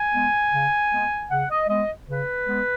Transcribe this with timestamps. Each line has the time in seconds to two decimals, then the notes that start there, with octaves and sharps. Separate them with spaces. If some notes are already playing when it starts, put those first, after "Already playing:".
Already playing: G#5
0.13 G#3 B3
0.52 C#3
0.91 G#3 B3
1.29 C#3 F#5
1.49 D#5
1.68 G#3 B3 D#5
2.07 C#3 B4
2.46 G#3 B3